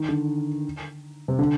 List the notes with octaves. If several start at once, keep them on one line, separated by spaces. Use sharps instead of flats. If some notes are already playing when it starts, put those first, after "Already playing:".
Already playing: D#3
D3
C3
D3